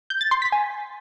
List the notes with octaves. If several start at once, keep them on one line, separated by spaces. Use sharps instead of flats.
G6
A6
C6
B6
G#5